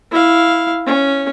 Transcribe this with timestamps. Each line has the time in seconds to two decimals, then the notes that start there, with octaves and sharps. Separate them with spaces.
0.12 E4 F5
0.87 C#4